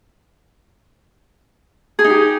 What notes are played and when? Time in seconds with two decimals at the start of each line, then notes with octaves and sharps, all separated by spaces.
1.99 G#4
2.04 D#4
2.10 G4